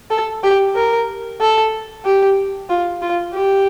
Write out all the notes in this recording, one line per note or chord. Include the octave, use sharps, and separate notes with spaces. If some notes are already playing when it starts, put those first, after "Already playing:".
A4
G4
A#4
A4
G4
F4
F4
G4